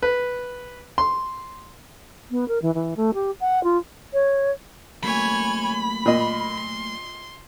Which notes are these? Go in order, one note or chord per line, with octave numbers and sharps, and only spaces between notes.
B4
C6
B3
A#4
E3
E3
A3
G4
F#5
F4
C#5
F#3 A3 A#3 C#5 G#5 B5
A#2 D#5 C6